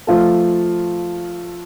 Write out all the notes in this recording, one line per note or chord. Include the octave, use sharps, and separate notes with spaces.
F3 A3 F4 A4